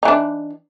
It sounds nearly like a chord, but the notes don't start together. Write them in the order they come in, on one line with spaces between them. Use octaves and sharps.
D#4 E3 D4